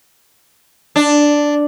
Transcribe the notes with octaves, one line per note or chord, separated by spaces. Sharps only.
D4